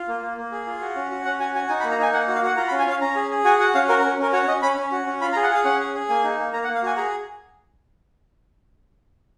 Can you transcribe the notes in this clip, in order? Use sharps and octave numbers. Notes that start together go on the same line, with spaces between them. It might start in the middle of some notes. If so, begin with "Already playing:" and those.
Already playing: F4
A#3
A#3
A#3
G#4
F4
F#4
C#4
F#4
C#4 F#5
F#4 G#5
F#4 G#5
D#4 G#5
B5
A#3
A#5
D#4 G#5
A#3 F#5
F#4
F5
F#4 F#5
F4 A#5
B5
C#4
G#5
C#4 F5
C#4 A#5
G#4
G#4
F#4 G#5
F#4 F#5
C#4 F5
F#4 A#4
A#4
C#4
C#4 A#4
F#4 C#5
C#4 D#5
C#4 B5
C#4
F#4
C#4
F4 B5
A#5
G#4
F#5
G#4 F5
C#4 F#5
G#4
G#4
A#3 G#5
D#4
A#3
A#3 A#5
F#5
A#3
F5
F#4 G#5
G#4 A#5